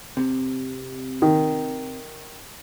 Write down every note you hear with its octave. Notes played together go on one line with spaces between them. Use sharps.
C3
D#3